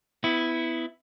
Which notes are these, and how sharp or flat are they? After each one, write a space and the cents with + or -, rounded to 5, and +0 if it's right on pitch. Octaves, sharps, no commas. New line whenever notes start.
B3 +25 E4 +0